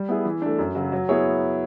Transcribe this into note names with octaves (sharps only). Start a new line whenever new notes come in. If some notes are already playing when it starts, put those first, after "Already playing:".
Already playing: G3
B3 E4 G#4
E3
A3 D4
F#2
C#3 F#3
F#3
B3 E4 G#4 C#5